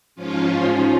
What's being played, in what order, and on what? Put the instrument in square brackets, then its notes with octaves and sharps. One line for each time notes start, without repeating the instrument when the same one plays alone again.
[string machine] G#2 F3 C#4 F4